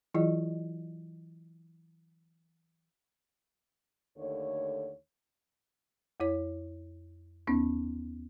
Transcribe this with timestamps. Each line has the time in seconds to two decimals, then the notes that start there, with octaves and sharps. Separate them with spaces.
0.14 E3 F#3 E4 F4 G#4 D#5
4.18 D#2 D3 A3 C#5
6.20 F2 E4 C#5
7.47 D#2 B3 C#4 D#4